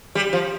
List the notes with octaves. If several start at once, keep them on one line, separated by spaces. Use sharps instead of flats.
G3
F3